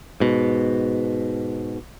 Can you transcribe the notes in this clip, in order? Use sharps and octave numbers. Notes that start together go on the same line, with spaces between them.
G#2 B2